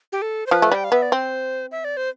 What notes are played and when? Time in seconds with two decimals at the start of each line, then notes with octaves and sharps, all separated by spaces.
0.12 G4
0.22 A4
0.46 C5
0.51 F3 B4
0.62 A3
0.71 G3 G5
0.84 F5
0.92 B3 E5
1.02 D5
1.12 C4 C5
1.72 E5
1.84 D5
1.97 C5